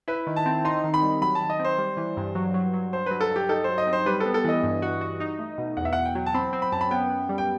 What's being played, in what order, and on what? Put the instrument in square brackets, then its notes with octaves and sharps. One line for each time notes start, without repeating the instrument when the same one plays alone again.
[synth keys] E4 [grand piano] B4
[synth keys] D#3
[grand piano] A5
[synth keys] C4
[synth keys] D#4 [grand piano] C6
[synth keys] D#3
[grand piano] B5
[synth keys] G3
[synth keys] F#3 [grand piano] B5
[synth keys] D#3 [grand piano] A5
[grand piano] D#5
[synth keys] C4
[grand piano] C5
[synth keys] G3
E3
G2
F#3
F#3
F#3
[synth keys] G2 [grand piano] C5
[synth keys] F#3 [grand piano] B4
[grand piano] A4
[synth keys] G2
[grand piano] G4
[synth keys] D#4 [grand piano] A4
[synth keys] F#3 [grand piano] C5
[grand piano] D#5
[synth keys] C4
[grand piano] C5
[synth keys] G3 [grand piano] B4
[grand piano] A4
[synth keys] B3
[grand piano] A4
[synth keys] E3 [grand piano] D#5
[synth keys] G2
F#4
F#4
D#4
A3
B2
[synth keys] E2 [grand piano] F#5
[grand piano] E5
[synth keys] E2 [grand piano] F#5
[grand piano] G5
[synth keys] F#3
[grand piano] A5
[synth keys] C4 [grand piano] B5
[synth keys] C4
[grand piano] B5
[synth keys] F#2 [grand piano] A5
[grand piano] B5
[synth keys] B3 [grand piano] G5
[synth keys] B3
G3
[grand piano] G5